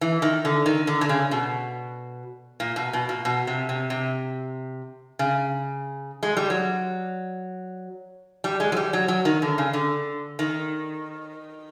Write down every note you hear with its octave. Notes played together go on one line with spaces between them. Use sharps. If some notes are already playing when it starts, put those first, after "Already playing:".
E3
D#3
D3
D#3
D3
D3
C#3
B2
A#2
B2
B2
A#2
B2
C3
C3
C3
C#3
G#3
G3
F#3
G3
G#3
F#3
G3
F#3
F#3
D#3
D3
C#3
D3
D#3